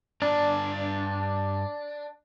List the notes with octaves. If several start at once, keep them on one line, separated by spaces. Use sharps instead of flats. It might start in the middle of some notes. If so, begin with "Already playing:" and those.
G2 D4 D5 A#5